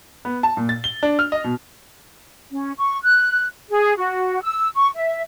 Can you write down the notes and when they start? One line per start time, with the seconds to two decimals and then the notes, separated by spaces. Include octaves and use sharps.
0.25 B3
0.43 A5
0.57 A#2
0.69 A6
0.84 G7
1.03 D4
1.19 F6
1.32 D#5
1.44 B2
2.51 C#4
2.78 C#6
3.04 F#6
3.70 G#4
3.97 F#4
4.42 E6
4.74 C#6
4.95 E5